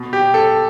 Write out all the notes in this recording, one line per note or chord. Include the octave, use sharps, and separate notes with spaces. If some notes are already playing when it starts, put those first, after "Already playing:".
Already playing: B2
G4
A4